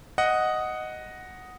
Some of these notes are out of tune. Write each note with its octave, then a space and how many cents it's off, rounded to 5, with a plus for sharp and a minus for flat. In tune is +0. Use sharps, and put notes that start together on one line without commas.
D#5 +0 F#5 +0